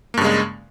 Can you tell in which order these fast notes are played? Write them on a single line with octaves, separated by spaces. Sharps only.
A#3 G2 C#3 G#3